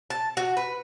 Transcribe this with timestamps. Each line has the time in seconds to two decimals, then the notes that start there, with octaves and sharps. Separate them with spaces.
0.10 A5
0.37 F#4
0.57 B4